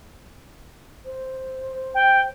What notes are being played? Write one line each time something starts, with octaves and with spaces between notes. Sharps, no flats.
C5
G5